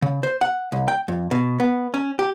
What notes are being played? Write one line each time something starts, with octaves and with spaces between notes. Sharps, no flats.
C#3
C5
F#5
C2
G5
F2
B2
B3
C#4
G4